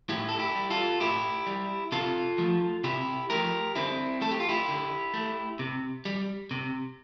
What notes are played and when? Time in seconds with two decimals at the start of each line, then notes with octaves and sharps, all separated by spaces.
0.09 A2 E4 G4
0.29 A4
0.39 E4 G4
0.55 G3
0.70 F4 A4
1.00 A2 E4 G4
1.47 G3
1.92 C3 F4 A4
2.38 F3 A3
2.84 C3 E4 G4
3.30 F3 A3 G4 A#4
3.75 D3 C4 E4
4.21 A3 A4
4.31 G4
4.40 F4
4.49 E4 G4
4.68 D3
5.14 A3
5.59 C3
6.05 G3
6.51 C3